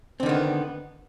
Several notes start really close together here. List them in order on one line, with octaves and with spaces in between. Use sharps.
C4 D3 D#3 B3